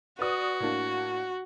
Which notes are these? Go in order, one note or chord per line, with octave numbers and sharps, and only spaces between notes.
F#4 B4 D5 D#6
A2 A#3 D4